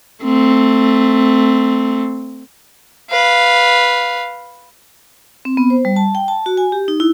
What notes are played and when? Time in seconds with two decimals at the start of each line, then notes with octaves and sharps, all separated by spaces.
0.24 A3 C4
3.10 B4 F5
5.45 C4
5.57 B3
5.70 C5
5.85 G3
5.96 A5
6.15 G5
6.28 A5
6.46 F#4
6.57 G#5
6.72 G4
6.88 D#4
7.00 E4